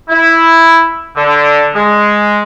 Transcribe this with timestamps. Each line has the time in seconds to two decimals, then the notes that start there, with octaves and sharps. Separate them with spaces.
0.09 E4
1.16 D3
1.74 G#3